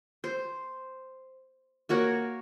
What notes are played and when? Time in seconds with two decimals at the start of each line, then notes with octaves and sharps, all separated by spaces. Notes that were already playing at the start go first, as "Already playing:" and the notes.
0.24 C5
1.89 A#3 F#4 A#4 C#5